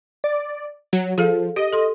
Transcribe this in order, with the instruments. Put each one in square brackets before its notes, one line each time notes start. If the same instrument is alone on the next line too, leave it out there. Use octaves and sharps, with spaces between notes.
[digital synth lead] D5
F#3
[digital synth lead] F3 [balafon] G#4 A4 F5
[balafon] G4 [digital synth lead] D#5
[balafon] A4 C6